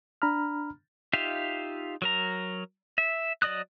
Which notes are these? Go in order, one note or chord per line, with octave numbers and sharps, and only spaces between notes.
D4 A#5 B5 F6
D#4 F4 G4 E5 F5
F#3 A#4 A#5
E5
F#3 D5 D#5 D#6 F#6